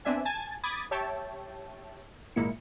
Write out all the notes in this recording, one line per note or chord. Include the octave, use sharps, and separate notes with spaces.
B3 C4 D4 E5 G#5
G#5 A5 G#6 A6
B5 D6 D#6 G#6 A6
G4 C#5 E5 G5 A5
G#1 A#2 G#3 A#3 E4 C#7